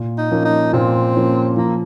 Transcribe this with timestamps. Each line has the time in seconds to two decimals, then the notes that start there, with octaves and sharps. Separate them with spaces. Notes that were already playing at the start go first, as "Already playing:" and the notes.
Already playing: A#2
0.18 D#4
0.31 F3 A#3 C#4
0.45 D#4
0.73 A#2 C4
1.15 F3 A#3 C#4
1.56 F3 A#3